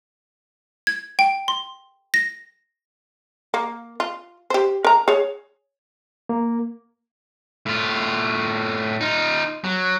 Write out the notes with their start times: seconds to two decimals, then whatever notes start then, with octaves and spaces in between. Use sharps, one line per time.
0.87 G#6
1.19 G5
1.48 C6
2.14 A#6
3.54 A#3
4.00 F4
4.50 G4 C5
4.84 A#4 A#5
5.08 G#4 C#5
6.29 A#3
7.66 A2 F4
9.01 D#4 F4
9.64 F#3